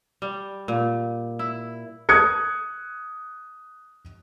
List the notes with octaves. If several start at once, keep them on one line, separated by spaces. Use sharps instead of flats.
G3
A#2
E4
D#6 F#6 G#6 C#7